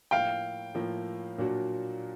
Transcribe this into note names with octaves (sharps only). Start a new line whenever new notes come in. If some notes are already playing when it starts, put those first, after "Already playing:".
A2 F3 A#3 F5 G5
A2 F3 A#3
A#2 F#3 A#3 D4 F#4